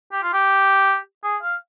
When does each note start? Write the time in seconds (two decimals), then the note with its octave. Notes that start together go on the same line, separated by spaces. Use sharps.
0.12 G4
0.22 F4
0.33 G4
1.24 G#4
1.43 F5